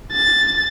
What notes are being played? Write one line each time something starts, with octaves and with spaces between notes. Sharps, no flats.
A6